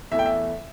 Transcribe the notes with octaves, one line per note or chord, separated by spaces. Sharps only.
E2 E3 A3 E5
G5
E5